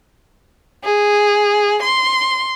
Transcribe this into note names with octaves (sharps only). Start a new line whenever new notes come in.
G#4
C6